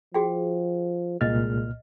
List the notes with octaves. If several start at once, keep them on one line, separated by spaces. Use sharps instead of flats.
F3 F#4 G#4 G5
C2 A#2 G#3 D#5 F6